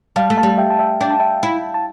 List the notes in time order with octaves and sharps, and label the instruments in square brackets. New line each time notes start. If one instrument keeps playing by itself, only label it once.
[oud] G3 [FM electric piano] F5 A5
[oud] A3
[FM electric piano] F5 A5
[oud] G3
[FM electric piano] E5 G5
A5
E5 G5
[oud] D4 [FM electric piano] G5
[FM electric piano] A5
E5 G5
[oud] E4
[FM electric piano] A5